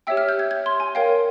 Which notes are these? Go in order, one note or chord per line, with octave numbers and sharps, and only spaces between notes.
G4 C#5 E5 G5 E6
F6
G6
G#6
G#6
C6
G#5
A#4 C#5 F5 G5